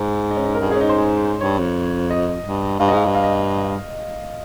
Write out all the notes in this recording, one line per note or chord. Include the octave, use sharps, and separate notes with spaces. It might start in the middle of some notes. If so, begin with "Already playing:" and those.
Already playing: G#2
D#4
C#4
D#4
A#4
G2 G#4
G#2 C#4 G#4
D#4
C5
G#4
G2 C#5
F2
D#5
G2
G2 F5
D#5
G#2 F5
G2
F5
D#5